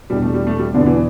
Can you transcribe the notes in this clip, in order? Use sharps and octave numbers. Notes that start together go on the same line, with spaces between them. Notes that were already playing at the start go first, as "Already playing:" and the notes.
E2 B2 G3 B3 D4
A3
G3
A3
G3
E2 B2 D3 B3 D4
E3